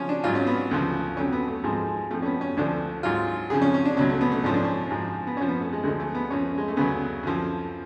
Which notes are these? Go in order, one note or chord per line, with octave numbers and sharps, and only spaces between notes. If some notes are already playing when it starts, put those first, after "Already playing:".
Already playing: C#3 F3 C#4
D4
G#2 F#3 F4
C#4
B3
D2 C#3 F3
F2 D3 F#3 C#4
B3
A3
G#2 F3 G#3
F2 F3 A3
C#4
B3
C#4
D2 D3 F3 D4
G#2 F#3 F4
F2 C#3 F3 G#4
C#4
C#4
D4
C#2 B2 F#3 C#4
A3
B3
A3
G#2 F3 C#4
D4
C#4
G#2 F3
B3
F#2 F3 C#4
B3
A3
G#3
D2 D3 F3 G#3
A3
B3
F#2 F3 C#4
G#3
A3
D2 C#3 F#3 B3
F#2 D3 F3